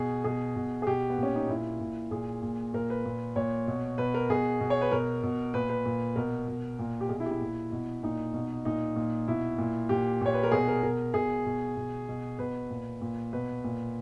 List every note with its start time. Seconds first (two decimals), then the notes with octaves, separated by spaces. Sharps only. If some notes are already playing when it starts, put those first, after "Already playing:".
Already playing: B2 G#4
0.24 B2 G#4
0.56 B2
0.82 G#4
0.87 B2 G4
1.10 B3
1.17 A#2
1.23 C#4
1.35 D#4
1.49 A#2 E4
1.81 A#2
2.11 A#2 G#4
2.42 A#2
2.74 A#2 A#4
2.90 B4
3.05 A#2
3.36 A#2 C#5
3.68 B2
3.98 B2 B4
4.14 A#4
4.30 B2 G#4
4.61 B2
4.70 C#5
4.81 B4
4.91 B2 A#4
5.23 B2
5.54 A#2 B4
5.69 B4
5.85 A#2
6.16 B2 A#4
6.48 B2
6.79 A#2
7.01 G4
7.09 B2 G#4
7.20 E4
7.26 G4
7.31 E4
7.41 A#2
7.72 B2
8.03 A#2 D#4
8.34 B2
8.65 A#2 D#4
8.96 A#2
9.28 B2 E4
9.58 A#2
9.89 A#2 G4
10.21 A#2 C#5
10.34 B4
10.43 A#4
10.52 B2 G#4
10.68 A#4
10.83 B2 A#4
11.14 B2 G#4
11.46 B2
11.77 B2
12.08 B2
12.39 B2 B4
12.70 A#2
13.01 A#2
13.33 B2 B4
13.64 A#2